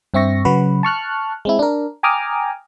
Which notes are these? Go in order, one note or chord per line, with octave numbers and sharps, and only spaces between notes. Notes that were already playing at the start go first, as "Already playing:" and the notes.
G2 C4 E5 C#6 A#6
C#3 F#3 F#4 B4
A5 C#6 F6 F#6
G#3 C4 E4
D4 A#4
G5 G#5 A#5 D6 D#6 F6